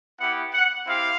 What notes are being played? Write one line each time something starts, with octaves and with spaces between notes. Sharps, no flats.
B3 E4 G4 F#5
F#5
C4 E4 G4 F5